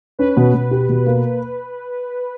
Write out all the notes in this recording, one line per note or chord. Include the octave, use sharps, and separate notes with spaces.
C#4 B4
B2
B2
G4
B2
A#3